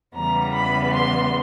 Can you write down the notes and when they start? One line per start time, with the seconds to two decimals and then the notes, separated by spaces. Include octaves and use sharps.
0.14 E2 C#3 E3 G3 B3 A#5
0.55 B5
0.94 C6